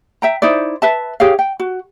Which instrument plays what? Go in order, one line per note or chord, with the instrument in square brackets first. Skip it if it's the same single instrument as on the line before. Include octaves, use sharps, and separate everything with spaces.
[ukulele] E5 G5 A#5
D#4 E4 C5 D5
B4 E5 A5
G4 G#4 C#5 F5
G5
F#4